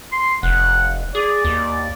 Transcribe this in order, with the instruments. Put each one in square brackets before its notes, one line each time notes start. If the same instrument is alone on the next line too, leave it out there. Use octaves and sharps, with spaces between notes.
[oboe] C6
[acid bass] F1 [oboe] F#5
[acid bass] G#4 [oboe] D5
[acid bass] D#2